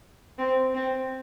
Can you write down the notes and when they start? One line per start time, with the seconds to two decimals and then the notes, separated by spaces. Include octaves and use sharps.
0.38 C4
0.74 C4